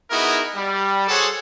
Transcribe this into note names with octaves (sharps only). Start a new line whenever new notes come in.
B3 D#4 E4 F#4 G#4 A#4
G3
F#4 G#4 A4 C5 C#5 F#5